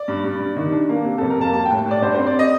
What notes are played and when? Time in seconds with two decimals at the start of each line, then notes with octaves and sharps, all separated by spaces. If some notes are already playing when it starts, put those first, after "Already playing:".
Already playing: D5
0.08 G2
0.24 G2
0.40 G2
0.56 D#3
0.72 D4
0.89 A#3
1.05 C3
1.18 F2 A4
1.30 A#4
1.38 A#3 A5
1.53 G3 A5
1.65 G5
1.71 A2
1.86 A2
1.91 D5
2.02 G2 C5
2.15 C5
2.18 C4
2.27 D5
2.39 D#5